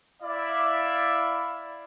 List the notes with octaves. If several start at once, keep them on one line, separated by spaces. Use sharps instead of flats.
E4 D5 E5 F5